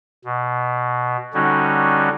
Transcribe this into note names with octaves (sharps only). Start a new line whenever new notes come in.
B2
D3 G3 C#4 D#4 F#4